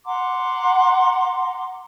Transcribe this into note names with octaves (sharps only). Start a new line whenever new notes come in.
F#5 A#5 C6 D6